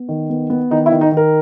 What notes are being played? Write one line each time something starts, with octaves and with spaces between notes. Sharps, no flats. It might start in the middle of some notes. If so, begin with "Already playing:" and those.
Already playing: B3
D#3
B3
B3
D#3 D#4
E4
D#3
D#4
D#3
A#4